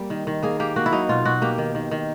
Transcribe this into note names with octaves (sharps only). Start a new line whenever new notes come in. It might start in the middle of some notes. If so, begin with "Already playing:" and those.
Already playing: G3 A#3
D#3
D#3
A#3 G#4
A#3 G4
A#3 F#4
E4
F#3 D#4
B2 F4
B2 F#4
A#3 G4
D#3
D#3
D#3